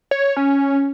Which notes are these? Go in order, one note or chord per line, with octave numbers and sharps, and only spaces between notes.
C#5
C#4